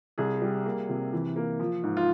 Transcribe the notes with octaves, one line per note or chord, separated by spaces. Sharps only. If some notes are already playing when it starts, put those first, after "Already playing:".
C2 G#4
G3
A#3
C3
E3
A#3
F3
G#2
F4